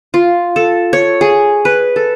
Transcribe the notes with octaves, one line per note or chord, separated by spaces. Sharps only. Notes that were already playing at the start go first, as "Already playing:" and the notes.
F4
A4
C#5
G#4
B4
A4